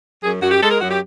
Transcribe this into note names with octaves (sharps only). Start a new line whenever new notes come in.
F#2 G#4
F#2 F#4
G4
G#3 A4
A#4
F#2 F#4
G4